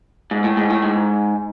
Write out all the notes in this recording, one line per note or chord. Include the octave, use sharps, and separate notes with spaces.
G#2
A2
G#2
A2
G#2